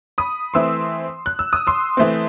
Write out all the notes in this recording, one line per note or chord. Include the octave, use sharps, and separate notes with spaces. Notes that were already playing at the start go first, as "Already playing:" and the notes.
B5 D#6
E3 A3 C4 C6 E6
F#6
E6
D#6
C6 E6
E3 A3 C4